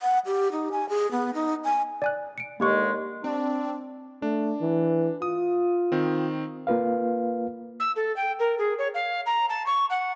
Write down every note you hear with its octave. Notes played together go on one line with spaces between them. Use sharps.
F#5
G4
D#4
G#5
G#4
B3
D#4
G#5
D5 G#5 F#6
C#7 D7
D#2 D3 G#3 A#3 G4 C#6
C4 D4
A3 D4
E3
F4 D#6
D#3 C4
A#3 F4 B4 F5
E6
A4
G5
A#4
G#4
C#5
F5
A#5
A5
C#6
F#5